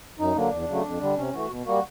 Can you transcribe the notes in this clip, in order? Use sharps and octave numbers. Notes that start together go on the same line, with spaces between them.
F#2 D#4
D3 F#3 A#3 D4
E2
C#3 F#3 A3
F2
D3 G3
C3 C#4
E3 A3 F#4
B2
G3 A#3 F#4